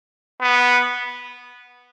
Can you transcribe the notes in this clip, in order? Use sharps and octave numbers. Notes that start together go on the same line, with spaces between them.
B3